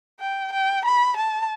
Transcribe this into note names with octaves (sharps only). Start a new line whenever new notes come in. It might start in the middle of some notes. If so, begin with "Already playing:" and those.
G5
G5
B5
A5